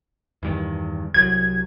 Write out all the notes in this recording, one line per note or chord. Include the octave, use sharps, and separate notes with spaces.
E2 G2 D#3
C2 F#3 G#6